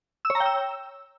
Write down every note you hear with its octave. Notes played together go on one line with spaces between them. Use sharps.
E6
C#5
A#5
G5
E6